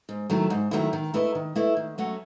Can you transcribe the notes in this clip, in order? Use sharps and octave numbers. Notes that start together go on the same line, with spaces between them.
G#2
D#3 F#3 A3 E4
G#2
D#3 F#3 A3 E4
D#3
A3 E4 B4 D#5
D#3
A3 E4 B4 D#5
D#3
F#3 A3 C#4 F#4